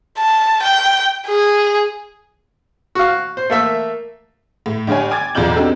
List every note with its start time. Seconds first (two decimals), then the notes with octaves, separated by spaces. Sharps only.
0.19 A5
0.62 G5
1.27 G#4
2.95 F#4 F5
3.37 C5
3.50 A3 A#3 E5
4.66 A2
4.87 G1 G2 G4 C#5 G#5
5.10 G5 G#5 D6 G#6 A6
5.35 B1 E2 F4 D5 G6 F#7
5.56 C4 D4 D#4 F#4 G4 A4